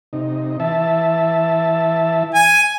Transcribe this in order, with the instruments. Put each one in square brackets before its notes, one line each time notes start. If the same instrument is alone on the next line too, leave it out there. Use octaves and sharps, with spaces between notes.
[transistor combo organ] C3 D#4
E3 E5 A5
[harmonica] G#5